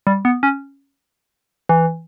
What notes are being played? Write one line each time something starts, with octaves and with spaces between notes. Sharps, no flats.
G3
B3
C#4
E3